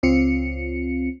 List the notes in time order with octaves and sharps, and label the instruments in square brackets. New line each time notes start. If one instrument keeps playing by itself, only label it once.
[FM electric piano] C#2 C4 F4 C#7